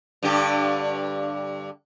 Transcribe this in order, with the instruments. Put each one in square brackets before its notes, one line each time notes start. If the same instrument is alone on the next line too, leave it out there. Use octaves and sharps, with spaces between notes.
[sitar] G2 D3 G4